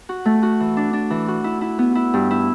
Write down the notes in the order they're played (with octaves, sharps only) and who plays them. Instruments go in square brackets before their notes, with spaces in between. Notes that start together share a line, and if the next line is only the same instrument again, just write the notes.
[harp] F#4
A3
F#4
E3
D4
D4
E3
F#4
E4
E4
B3
E4
G2
E4